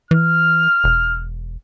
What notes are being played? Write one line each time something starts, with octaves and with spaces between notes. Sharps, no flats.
E3 F6
E1